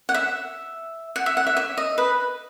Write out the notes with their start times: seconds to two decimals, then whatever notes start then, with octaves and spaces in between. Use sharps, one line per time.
0.09 F#5
0.15 E5
1.16 F#5
1.26 E5
1.37 F#5
1.47 E5
1.57 E5
1.77 D#5
1.98 B4